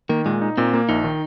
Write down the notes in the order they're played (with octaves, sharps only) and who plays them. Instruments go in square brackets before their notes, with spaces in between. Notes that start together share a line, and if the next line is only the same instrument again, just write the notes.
[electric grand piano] D#3 [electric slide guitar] A#3
[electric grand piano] A#2 [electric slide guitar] G#3
[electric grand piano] D#4
[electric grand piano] A#2 [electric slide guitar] C4
[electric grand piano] A#3
[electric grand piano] A#1 [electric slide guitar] D#4
[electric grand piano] D#3